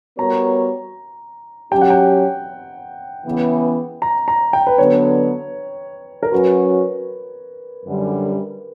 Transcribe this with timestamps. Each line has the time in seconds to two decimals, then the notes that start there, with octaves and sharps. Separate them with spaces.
0.18 G3 B3 F#4 A#4 C#5 A#5
1.72 F#3 C#4 G4 G5
1.81 F#5
1.90 G5
3.25 C#3 E3 B3
4.02 A#5
4.28 A#5
4.53 G5
4.67 B4
4.78 D3 F#3 B3 C#5
6.23 A#4
6.32 F#3 C#4 F#4 B4
7.86 F#2 D3 G3